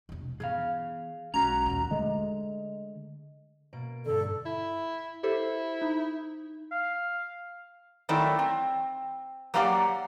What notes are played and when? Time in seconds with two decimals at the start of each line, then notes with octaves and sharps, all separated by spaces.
0.09 E1 C3
0.40 E3 B3 G#4 F5
1.34 B1 G#3 C#4 F#4 A#5
1.66 D#2 A#2
1.91 D3 G#3 A3 D#5
3.73 B2 A#3 D7
4.05 G2 D3 A4
4.46 E4
5.23 E4 G4 A4 C5
5.82 D#4
6.72 F5
8.09 D#3 F#3 A3 C4 E4 D5
8.39 C4
9.54 F#3 A3 A#3 G4 D5 F#5